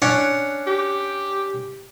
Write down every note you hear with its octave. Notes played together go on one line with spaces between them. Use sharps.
C#4 D4 F#5
G4